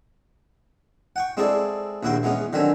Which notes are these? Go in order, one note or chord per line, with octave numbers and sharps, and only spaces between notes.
F#5 G5 C#6
G#3 C4 E4 G#4 A4 D5
A#1 D#2 E4 F#4 G5 C6
E3 G#3 B3 C#4
D3 D#3 F#3 C4 E5 G#5